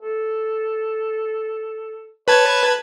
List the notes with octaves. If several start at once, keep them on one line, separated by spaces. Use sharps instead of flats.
A4
B4 C#5 A5 G#6